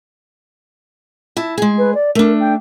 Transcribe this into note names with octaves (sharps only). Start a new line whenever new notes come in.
E4 A5
G#3 G#4
B4
D5
A3 D4 A#4
G5